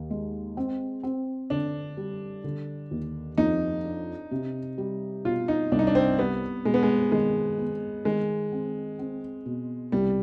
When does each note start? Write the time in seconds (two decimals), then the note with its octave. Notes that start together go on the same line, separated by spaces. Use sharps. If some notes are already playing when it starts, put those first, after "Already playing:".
Already playing: D#2
0.10 G#3
0.57 C4
1.03 C4
1.50 D3 D4
1.97 G3
2.44 D3
2.91 D#2
3.38 F2 D#4
3.85 D4
4.31 C3
4.78 G3
5.25 B2 F4
5.48 D#4
5.72 C2 D4
5.79 D#4
5.87 D4
5.95 C4
6.18 G3 B3
6.65 B2 G#3
6.74 B3
6.83 G#3
7.12 D#3 G#3
7.59 B3
8.05 D#3 G#3
8.52 C4
8.99 C4
9.46 B2
9.92 C2 G3